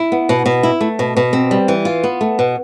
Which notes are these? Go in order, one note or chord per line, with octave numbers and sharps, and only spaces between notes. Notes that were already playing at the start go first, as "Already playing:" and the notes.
Already playing: E4
B3
B2
B2
E4
A3
B2
B2
C4
G3
E3
F4
B3
A3
B2